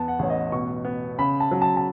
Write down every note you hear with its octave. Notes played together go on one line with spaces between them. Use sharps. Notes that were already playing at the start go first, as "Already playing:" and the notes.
Already playing: E2 B3 A5
F#5
A1 C#5
D#5
B2 C#6
B3
C#3 B5
A5
F#3
A5
A5